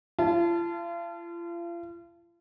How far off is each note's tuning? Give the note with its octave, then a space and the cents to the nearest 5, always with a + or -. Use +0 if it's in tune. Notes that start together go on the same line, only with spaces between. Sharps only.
F4 -40 A5 +0